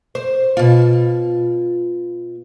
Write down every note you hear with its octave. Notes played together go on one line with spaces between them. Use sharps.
C5
B2 F4